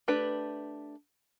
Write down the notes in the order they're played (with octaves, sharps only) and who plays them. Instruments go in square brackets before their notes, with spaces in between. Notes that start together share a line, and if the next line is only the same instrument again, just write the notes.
[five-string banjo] A3 D4 G4 B4